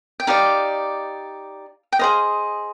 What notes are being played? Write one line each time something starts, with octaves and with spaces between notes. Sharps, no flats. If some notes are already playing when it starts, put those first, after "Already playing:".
G5
D#4 G4 D5 F5
G5
G#4 C5 D#5 F5